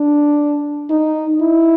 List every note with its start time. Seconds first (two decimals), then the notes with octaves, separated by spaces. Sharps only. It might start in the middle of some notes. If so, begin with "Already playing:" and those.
Already playing: D4
0.90 D#4
1.41 E4